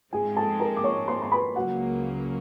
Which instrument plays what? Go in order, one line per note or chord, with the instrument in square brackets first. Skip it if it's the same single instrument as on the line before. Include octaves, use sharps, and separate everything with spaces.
[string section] G#2 F3 G#3 C4 [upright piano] G#4 G#5
[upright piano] A4 A5
A#4 A#5
D6
C#5 C#6
C5 C6
C6
B4 B5
[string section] C#2 C#3 F#3 A#3 [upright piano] F#4 F#5